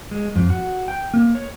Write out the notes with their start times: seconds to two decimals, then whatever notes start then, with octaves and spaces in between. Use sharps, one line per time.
0.11 G#3
0.36 F2
0.50 F#4
0.88 G5
1.14 A#3
1.35 C#5